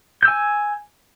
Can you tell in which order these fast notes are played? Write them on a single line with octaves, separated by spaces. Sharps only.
G6 E6 G#5